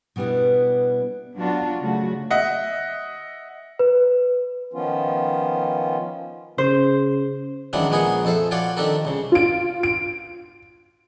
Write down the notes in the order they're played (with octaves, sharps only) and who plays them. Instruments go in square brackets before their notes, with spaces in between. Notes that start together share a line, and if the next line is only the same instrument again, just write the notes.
[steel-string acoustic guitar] B2 G3 B3 D4 E4
[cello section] F#3 B3 D4 F4 F#4
C#3 F#3 A3 F#4
[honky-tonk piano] D#5 E5 F#5
[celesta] B4
[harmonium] D#3 F3 B3 C#4 F4
[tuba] C#3 [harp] C5
[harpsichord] D#3 E3 F#3 G#3 C#4 D4
A#1 G#3 B3 G#4 A#4 C#5
F2 A4 C5 E5
F4 F#4 C#5 D5 G5
D#3 C4 D4 G4 A4 A#4
C2 C#3
[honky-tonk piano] F4 D7
D7